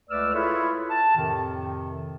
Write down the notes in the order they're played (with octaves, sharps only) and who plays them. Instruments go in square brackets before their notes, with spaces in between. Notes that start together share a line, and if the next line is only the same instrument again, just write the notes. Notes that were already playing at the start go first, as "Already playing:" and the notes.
[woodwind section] C#2 A3 B4 D5 E6 F6
E4 F4 G#4 A4 B4 C#5
A5
F2 A2 C3 D#3